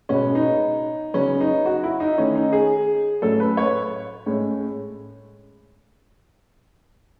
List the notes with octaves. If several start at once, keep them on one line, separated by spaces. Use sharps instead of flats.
B2 G#3 B3 C#4
D#4
C#3 F#3 B3 C#4
D#4
F#4
E4
D#4
D#3 A3 C#4
D#4
G#4
A2 F#3 A3 C#4 A4
B4
C#5
A2 G#3 C#4